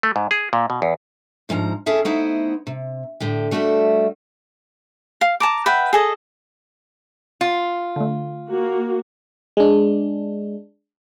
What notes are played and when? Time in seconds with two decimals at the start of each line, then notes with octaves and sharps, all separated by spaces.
0.03 A3
0.16 G#2
0.31 G#4
0.53 A#2
0.70 B2
0.82 E2
1.49 D2 G#2 F3 G#5 A#5
1.86 C#4 E4 G#4 A4 E5
2.05 A3 B3 D#4 E4 C5 F#5
2.67 C3
3.20 A2 D3 G4
3.51 G3 A3 F#4 D#5 E5
5.21 F5
5.40 A5 A#5 D6
5.66 B4 E5 F#5 G5
5.93 G#4 A4 D#5
7.41 F4
7.96 D3 A3
8.50 A#3 F#4
9.57 G#3 D4